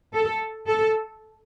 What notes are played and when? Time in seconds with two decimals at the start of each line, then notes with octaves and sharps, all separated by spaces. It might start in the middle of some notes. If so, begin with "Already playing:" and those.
0.14 A4
0.68 A4